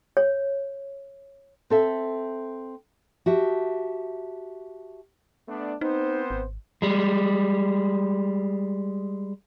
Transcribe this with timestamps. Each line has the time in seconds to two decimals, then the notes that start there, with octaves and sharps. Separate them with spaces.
0.17 C#5
1.70 C4 A4 E5
3.26 F#4 G4 E5 A5
5.48 A3 B3 D4
5.81 B3 C4 D#4 C5
6.30 G#1
6.82 G3 G#3